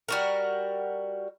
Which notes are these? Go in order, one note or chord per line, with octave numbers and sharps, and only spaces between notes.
G3 F#4 A#4